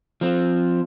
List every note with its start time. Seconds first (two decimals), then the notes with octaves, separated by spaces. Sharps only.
0.21 F3 C4